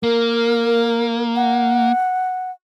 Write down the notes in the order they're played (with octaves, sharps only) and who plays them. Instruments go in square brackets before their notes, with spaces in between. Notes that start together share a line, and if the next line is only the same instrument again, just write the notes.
[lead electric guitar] A#3 [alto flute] A#4
[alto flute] F#5